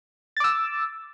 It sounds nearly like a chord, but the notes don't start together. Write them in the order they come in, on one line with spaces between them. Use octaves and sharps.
A6 D6 E6